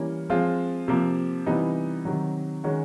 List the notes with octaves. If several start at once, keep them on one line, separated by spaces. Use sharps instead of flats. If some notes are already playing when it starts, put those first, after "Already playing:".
Already playing: E3 G3 A#3 C#4
F3 G#3 C4 F4
C3 F3 A#3
C3 E3 G3 B3 D#4
C3 D#3 F#3
D#3 G#3 C#4 F#4